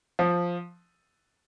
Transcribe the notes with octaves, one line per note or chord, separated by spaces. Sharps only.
F3